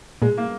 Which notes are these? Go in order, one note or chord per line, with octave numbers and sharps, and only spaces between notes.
A#2 G#3
A#3